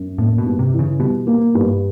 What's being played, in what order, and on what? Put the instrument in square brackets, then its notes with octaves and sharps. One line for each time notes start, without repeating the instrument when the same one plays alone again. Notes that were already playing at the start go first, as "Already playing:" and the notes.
Already playing: [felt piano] F#2
[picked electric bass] A2 [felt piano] A#3
[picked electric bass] B2
[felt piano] G2
[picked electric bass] C3
[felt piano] E3
[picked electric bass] C#3
[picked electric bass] B2 [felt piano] G3
[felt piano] A#3
G2